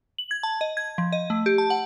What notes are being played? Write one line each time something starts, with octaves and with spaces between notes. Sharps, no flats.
F#7
G#6
A5
D#5
G#6
F3
D#5
A3
G4
A5
F#5